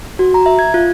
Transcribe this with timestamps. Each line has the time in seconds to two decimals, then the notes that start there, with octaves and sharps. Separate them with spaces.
0.19 F#4
0.34 A#5
0.46 E5
0.59 G#6
0.74 F4